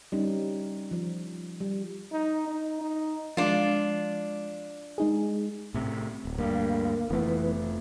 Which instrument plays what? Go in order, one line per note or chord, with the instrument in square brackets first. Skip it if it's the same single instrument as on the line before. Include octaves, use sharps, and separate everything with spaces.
[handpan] G3 C#4 D#4
F3
G3
[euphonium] D#4
D#4
D#4
[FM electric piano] F3 G#3 [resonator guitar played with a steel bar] D4 F4
[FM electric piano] G#3 D#4 G#4
[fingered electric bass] A2 C3
D1
[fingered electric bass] D2 G2 [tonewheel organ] A#3
[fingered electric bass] F1 A3 [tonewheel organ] E3 B3